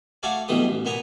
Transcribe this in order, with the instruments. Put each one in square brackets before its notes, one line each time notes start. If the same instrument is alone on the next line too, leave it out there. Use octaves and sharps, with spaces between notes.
[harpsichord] A3 F#4 A4 D5 F5 G#5
B1 G2 B2 E3 A3 D#6
A1
A#2 B3 G#5 A#5 D#6